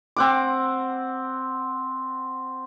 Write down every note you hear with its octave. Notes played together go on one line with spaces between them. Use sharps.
C4 F#5 D6